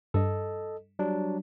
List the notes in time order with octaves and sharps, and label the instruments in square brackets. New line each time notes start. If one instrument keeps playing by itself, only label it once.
[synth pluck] G2 [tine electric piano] A4 D#5
[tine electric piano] F#3 G3 D4